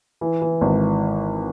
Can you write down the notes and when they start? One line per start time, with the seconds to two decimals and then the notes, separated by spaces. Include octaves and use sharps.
0.21 E3
0.42 E3
0.61 G#1